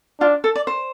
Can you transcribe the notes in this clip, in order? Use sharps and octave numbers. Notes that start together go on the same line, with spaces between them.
D4 F4
A4
D5
C5